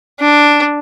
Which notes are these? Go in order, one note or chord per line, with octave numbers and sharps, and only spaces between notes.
D4